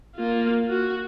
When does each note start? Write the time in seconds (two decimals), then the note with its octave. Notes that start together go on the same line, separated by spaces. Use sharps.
0.16 A#3 F4
0.69 F#4